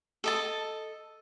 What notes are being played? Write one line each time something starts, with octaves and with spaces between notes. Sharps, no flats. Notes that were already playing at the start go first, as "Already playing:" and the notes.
A4 D#5 A5